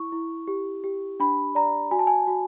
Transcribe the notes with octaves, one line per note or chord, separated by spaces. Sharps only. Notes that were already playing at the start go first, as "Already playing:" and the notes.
Already playing: E4 C#6
E4
G4
G4
D4 B5
D5 A#5
F#4 G#5
A5
G#5
F#4